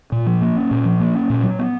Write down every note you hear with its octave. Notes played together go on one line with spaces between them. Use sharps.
A#2
F3
A#3
C#4
A#2
F3
A#3
C#4
A#2
F#3
B3